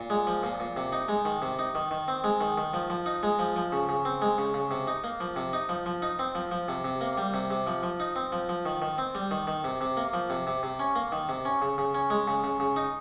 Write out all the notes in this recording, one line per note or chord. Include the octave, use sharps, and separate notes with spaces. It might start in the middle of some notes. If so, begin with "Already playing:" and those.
Already playing: A#2
G#3
F3
A#2
A#2
C3
D#4
G#3
D#3
C3
D#4
D#3
D#3
C4
G#3
D#3
D#3
F3
F3
D#4
G#3
F3
F3
C#3
C#3
C4
G#3
C#3
C#3
C3
D#4
A#3
F3
C3
D#4
F3
F3
D#4
C4
F3
F3
C3
C3
A#3
G3
C3
C3
F3
F3
D#4
C4
F3
F3
D#3
D#3
C4
G3
D#3
D#3
C3
C3
A#3
F3
C3
C3
C3
C#4
A#3
D#3
C3
C#4
C#3
C#3
C#4
G#3
C#3
C#3
C#3
D#4